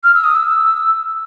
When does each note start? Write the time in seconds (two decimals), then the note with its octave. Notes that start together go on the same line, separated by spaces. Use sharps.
0.04 F6
0.14 E6
0.24 D#6
0.35 E6